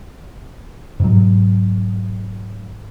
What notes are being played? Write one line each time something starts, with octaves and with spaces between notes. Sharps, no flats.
G#2 B2 F#3